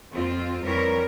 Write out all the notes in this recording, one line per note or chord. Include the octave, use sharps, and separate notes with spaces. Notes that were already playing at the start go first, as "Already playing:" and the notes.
F2 C4 F4
F2 E3 G3 A#4 C#5